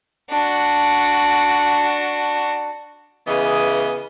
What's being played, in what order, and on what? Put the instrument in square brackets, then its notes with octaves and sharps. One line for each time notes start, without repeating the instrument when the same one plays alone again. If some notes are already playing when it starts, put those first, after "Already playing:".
[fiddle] D4 F#4
[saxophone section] C#3 E3 B3 G#4 D#5